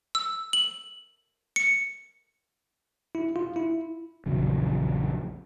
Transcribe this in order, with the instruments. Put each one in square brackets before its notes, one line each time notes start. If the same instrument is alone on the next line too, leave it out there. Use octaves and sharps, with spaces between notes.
[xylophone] E6
F#7
C#7
[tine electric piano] E4
F4
E4
[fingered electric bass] A#1 E2 C#3 F#3